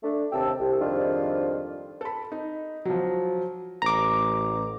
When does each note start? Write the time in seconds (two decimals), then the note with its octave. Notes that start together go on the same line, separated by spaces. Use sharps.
0.03 A3 D4
0.32 D#2 C3 G5 A5 E6
0.60 C2
0.80 F2 G#2 D#3 G3 D4 F4
2.01 A4 B5
2.32 D#4
2.85 F3 F#3
3.82 A1 A#5 D6